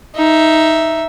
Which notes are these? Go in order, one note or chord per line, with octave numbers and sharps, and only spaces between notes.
D#4 E5